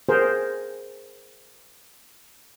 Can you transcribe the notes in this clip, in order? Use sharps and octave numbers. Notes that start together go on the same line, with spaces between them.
G#4 A#4 C5